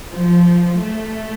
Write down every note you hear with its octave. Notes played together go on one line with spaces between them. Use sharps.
F3
A3